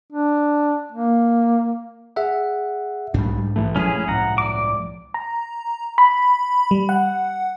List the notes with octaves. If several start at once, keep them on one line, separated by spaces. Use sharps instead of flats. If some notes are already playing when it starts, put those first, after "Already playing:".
D4
A#3
G#4 E5 F#5
B1 G#2 G3 D4
A#1 E3 A3
G2 F3 G#3 C#4 E4 G#4
C2 A2 F#5 A#5
D5 D6
A#5
B5
G3
F#5